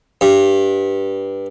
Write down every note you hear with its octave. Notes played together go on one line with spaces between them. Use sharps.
G2